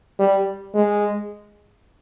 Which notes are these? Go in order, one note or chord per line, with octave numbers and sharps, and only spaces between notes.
G3
G#3